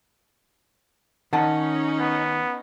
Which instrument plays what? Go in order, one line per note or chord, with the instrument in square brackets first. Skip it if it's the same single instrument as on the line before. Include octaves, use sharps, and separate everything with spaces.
[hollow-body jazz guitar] D#3 F#5 A5 [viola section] C#4 D#4
[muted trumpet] B3